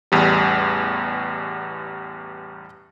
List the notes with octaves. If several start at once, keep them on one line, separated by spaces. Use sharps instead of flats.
A1 E2 G3